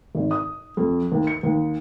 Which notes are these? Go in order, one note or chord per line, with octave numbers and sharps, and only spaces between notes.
G#1
D#6
F2
D#2
C#7
D#2